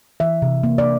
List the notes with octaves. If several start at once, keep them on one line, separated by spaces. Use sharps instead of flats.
E3 E5
C3
A#3
D5